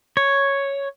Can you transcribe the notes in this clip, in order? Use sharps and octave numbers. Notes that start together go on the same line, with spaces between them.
C#5